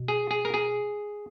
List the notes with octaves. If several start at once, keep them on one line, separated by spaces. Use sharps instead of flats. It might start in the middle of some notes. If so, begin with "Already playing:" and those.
Already playing: B2
G#4
G#4
A#4
G#4